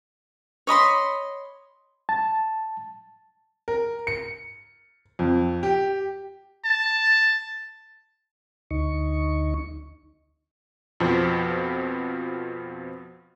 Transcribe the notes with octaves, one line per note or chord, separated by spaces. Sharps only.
C#5 D#5 B5 C6
A5
A#4
C#7
F2
G4
A5
D2 D#4 C#6
F2 B2 F3 C4